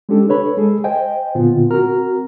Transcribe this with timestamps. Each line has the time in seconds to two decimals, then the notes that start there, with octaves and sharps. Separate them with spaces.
0.09 G#3 C#4 D4 G4 A4
0.28 D4 A4 B4 C#5 B5
0.57 G#3 G#4 A4
0.84 C5 D#5 G5 G#5
1.35 A#2 D3 B3 F4
1.71 C4 F#4 A#4 A#5 F6